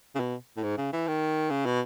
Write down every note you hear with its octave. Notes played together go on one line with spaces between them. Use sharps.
C#3
B2
A2
G#2
C#3
E3
D#3
C#3
B2